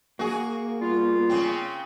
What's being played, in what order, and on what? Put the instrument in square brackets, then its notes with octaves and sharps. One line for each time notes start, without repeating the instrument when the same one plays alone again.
[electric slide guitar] A#3 [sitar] F#4 G#4
[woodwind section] G3 B3 F4
[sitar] C#3 C4